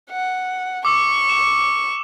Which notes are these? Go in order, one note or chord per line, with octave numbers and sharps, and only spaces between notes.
F#5
C#6 D6 E6
E7